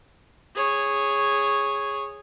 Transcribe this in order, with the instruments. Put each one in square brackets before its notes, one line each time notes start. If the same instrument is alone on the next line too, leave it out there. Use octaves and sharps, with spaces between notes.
[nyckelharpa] G#4 C#5